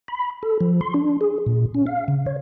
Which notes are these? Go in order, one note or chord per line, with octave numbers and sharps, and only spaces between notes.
B5
A4
F3
C6
D4
G#4
A#2
C#4
F5
C#3
C#5